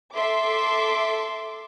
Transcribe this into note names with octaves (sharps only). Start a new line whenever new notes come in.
A4 E5 C6 D6